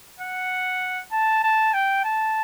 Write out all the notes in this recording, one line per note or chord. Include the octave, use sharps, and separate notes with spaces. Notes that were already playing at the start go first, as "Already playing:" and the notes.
F#5
A5
A5
G5
A5